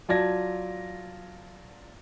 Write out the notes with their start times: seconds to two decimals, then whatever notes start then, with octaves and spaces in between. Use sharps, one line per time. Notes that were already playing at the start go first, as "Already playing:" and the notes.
0.09 F#3 F4 D5 A5 G#6 A#6